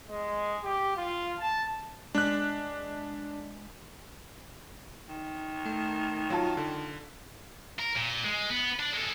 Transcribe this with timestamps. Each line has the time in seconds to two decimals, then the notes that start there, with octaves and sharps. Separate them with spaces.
0.10 G#3
0.63 G4
0.95 F4
1.39 A5
2.15 G#3 D4 F#6 B6
5.09 D#3
5.65 A3
6.30 F#3 F4 A5
6.57 D3
7.79 A#4
7.96 A#2
8.25 G#3
8.50 B3
8.80 D4
8.94 G#3 A4